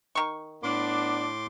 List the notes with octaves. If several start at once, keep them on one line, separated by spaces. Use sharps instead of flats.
D#3 C#6
A2 B3 D4 C6 D6